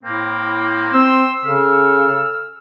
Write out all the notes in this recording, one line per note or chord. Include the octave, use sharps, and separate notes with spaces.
A2 A#3 C4
C4 C6 E6
C#3 A4 E6 F6